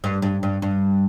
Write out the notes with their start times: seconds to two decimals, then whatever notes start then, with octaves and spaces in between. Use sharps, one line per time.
0.04 G2
0.22 G2
0.43 G2
0.62 G2